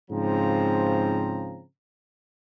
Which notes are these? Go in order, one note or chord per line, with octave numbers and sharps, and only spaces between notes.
G#2 C#3 F3 C4 A#5